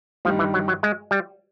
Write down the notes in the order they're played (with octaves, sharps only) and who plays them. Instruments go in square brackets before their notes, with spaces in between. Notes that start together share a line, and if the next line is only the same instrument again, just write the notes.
[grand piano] G2 D#3 G3 [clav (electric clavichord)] F3
[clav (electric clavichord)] E3
F#3
F#3
G#3
G3